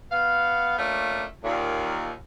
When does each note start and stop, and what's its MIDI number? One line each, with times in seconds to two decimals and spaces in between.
0.11 0.75 59
0.11 0.75 77
0.77 1.23 57
0.77 1.23 58
0.77 1.23 61
0.77 1.23 62
0.77 1.23 65
1.44 2.11 39
1.44 2.11 46